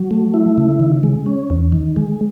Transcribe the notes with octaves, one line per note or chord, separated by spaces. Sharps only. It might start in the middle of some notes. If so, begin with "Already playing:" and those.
Already playing: F#3
A3
E4
C#3
D#3
G#3
C#4
E2
D#3
G#3